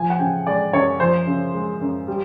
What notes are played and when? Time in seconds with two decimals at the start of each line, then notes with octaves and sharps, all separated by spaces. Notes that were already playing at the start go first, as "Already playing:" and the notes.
Already playing: F3 G#5
0.10 F#5
0.19 C#3 G5
0.46 G#3 D5
0.73 F#2 C#5
1.00 F3 C5
1.27 C#3
1.54 G#3
1.81 F#2
2.08 G3